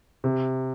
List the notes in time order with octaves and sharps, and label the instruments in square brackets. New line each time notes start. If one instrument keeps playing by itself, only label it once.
[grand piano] C3